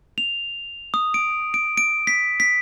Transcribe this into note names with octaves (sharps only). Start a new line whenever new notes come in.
F7
D#6
D7
D7
D7
B6
B6